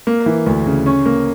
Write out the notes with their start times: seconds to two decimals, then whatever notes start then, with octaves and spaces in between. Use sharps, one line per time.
0.07 A#3
0.26 E3
0.47 D2
0.66 C#3
0.86 C#4
1.06 A#3